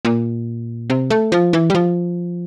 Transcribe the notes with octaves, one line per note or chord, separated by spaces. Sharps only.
A#2
C3
A3
F3
E3
G3
F3